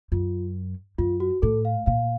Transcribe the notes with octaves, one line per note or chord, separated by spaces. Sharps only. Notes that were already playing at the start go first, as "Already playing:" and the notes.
F#2 F4
F#2 F4
F#4
A2 A4
F5
A#2 F5